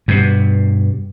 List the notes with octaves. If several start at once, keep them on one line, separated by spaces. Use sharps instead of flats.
G2 B2